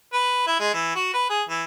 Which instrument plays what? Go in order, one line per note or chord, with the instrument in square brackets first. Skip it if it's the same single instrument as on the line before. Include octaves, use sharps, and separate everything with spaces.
[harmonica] B4
E4
G#3
E3
F#4
B4
G#4
E3